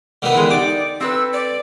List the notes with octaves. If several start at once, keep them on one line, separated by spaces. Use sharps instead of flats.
D3 D#3 B3
E3 G#3
D#4 G4 D5 D6
C4 A4 B4 E6
D5